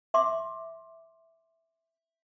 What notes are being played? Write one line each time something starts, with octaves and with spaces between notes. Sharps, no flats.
E5 C6 D6